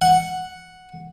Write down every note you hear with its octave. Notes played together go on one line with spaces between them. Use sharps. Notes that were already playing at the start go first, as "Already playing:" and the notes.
F#5